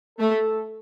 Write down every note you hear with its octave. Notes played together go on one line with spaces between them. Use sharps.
A3 A4